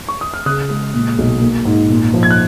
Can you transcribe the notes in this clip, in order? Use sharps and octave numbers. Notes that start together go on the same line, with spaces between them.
C#6
D#6
F6
C#3 D#6 F#6
G#3
A#2
B1
A#3
G#2
A#2
F3
G#6
F#6